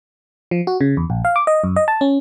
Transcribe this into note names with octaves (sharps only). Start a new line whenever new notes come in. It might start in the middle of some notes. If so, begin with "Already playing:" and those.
F3
F#4
C#3
E2
A#1
F5
D6
D#5
F#2
D#5
A5
C#4